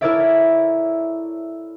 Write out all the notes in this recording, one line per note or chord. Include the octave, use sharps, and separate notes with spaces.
E4 A4 A#4 C#5 D5 E5